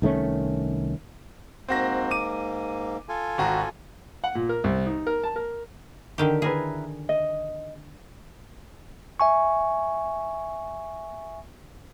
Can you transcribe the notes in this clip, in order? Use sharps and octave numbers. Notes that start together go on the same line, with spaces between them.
C2 D#3 A3 C#4
G#2 A#3 C4 F#4 A#6
D6 D#7
F4 A4 G#5
G#1 F#4 A#5
F#5
A#2
A#4
C2
D#4
A#4
A5
A#4
D3 D#3 G4
E4 G#4 A#4 B4
D#5
E5 G#5 C#6